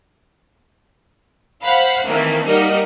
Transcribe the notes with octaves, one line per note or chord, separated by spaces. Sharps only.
C5 F5 F#5 B5
D#3 E3 A3 A#3 C4
G3 A#3 D#4 A#4 D#5 F#5